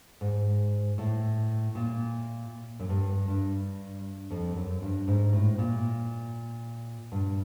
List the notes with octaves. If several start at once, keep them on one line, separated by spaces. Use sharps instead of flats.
G#2
A2
A#2
F#2
G2
G2
F2
F#2
G2
G#2
A2
A#2
G2